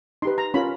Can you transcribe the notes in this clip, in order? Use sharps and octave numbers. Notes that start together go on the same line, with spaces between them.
D#4 G4 B4 C6
A#5
C#4 F4 A#4 B5